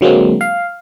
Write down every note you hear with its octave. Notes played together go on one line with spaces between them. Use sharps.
D3 F#3 G#3 A#3 C4
F5